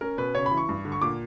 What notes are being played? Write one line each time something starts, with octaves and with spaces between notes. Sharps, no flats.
C#4 A#4
B2 B4
C#3 C#5
B5
E3
C#6
G2
D3
C#6
A#2 D6